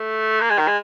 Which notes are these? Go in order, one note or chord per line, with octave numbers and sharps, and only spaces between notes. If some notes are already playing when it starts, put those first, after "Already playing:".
Already playing: A3
A#3
G#3
D#3
G#3